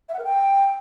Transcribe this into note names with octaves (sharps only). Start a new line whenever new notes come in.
E5
F#5
A#4
G5